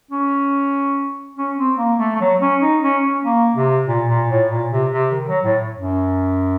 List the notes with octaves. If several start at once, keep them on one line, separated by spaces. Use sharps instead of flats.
C#4
C#4
C4
A#3
A3
A3
F#3
C#4
D#4
C#4
C#4
A#3
C3
A#2
A#2
A2
A#2
C3
C3
D#3
F#3
A2
F#2